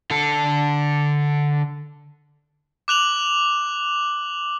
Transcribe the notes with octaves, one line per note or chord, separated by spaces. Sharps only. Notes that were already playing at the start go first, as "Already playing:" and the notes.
D3 A4
D6 F#6 F7 F#7